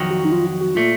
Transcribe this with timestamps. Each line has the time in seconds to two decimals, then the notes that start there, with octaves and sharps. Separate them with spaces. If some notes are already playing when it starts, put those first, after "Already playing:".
Already playing: F2 D#3 F#3
0.10 F#4
0.25 D#4
0.32 F4
0.46 F#4
0.61 F#4
0.75 A#2 A3 F4